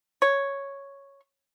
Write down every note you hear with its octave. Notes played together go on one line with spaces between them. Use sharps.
C#5